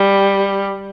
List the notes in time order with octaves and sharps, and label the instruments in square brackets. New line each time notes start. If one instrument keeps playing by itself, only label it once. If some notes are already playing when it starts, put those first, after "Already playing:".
Already playing: [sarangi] G3